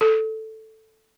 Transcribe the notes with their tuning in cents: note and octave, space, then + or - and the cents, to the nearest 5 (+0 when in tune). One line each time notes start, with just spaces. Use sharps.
A4 +0